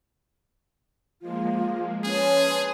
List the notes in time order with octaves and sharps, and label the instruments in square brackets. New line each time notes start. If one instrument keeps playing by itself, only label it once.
[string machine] F3 G#3 A#3 [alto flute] F4
[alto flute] C#4 [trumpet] G#4 [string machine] B4 A5 C6